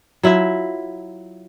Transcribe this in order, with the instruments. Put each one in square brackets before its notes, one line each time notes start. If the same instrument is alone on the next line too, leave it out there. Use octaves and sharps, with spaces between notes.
[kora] F#3 E4 F4 E5